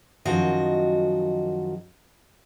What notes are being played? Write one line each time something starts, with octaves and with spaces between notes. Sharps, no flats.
F#2 D#3 F3 F#4 D#5